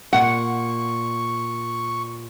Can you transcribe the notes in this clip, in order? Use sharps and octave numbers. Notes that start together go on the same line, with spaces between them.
A#2 F#5 C#6